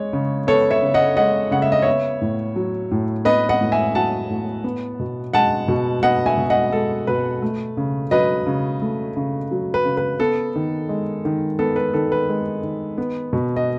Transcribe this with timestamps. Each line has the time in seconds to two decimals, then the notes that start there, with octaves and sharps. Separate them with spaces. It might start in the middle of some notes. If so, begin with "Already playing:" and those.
Already playing: G#3 C#5
0.13 C#3
0.47 B3 A4 C#5
0.71 C#5 E5
0.82 C#3
0.94 D#5 F#5
1.17 G#3 D#5 F#5
1.51 C#3 F#5
1.62 E5
1.72 D#5
1.82 B3 C#5 E5
2.21 A2
2.56 F#3
2.91 A2
3.25 B3 B4 D#5
3.49 D#5 F#5
3.61 A2
3.72 E5 G#5
3.94 F#3 F#5 A5
4.30 A2
4.64 B3
5.00 B2
5.33 G#3 F#5 A5
5.68 B2
6.03 B3 D#5 F#5
6.26 E5 G#5
6.38 B2
6.50 D#5 F#5
6.72 G#3 A4
7.07 B2 B4
7.42 A3
7.77 C#3
8.11 F#3 B4 D#5
8.47 C#3
8.82 A3
9.17 C#3
9.51 F#3
9.74 B4
9.85 C#3
9.97 B4
10.20 B3 A4
10.56 D#3
10.89 G#3
11.25 D#3
11.59 B3 A4
11.76 B4
11.94 D#3 A4
12.12 B4
12.29 G#3
12.63 D#3
12.98 B3
13.33 B2
13.56 D#5